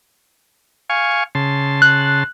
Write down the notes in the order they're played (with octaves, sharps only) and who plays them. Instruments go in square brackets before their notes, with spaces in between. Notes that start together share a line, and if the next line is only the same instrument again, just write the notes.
[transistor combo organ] F5 G#5 C#6
C#3 A5 C6
[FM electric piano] F#6